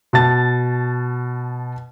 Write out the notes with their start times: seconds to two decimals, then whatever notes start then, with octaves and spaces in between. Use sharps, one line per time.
0.13 B2 A5 A6